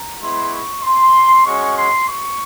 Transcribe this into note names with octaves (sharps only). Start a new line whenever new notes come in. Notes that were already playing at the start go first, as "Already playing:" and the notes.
Already playing: A#5
G#3 B3 E4 C6
C#6
C6
G#3 C#4 F#4 C#6
C6
C#6